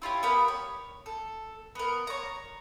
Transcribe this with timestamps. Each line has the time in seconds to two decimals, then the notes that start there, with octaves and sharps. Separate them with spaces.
0.02 E4 F4 G4 C#5
0.23 B3 G4 A#4 B5
0.48 C#5
1.06 A4
1.75 B3 A#4
2.07 C#5 A#5